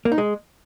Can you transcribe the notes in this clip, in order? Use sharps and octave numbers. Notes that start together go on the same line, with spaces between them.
A#3
D#4
G#3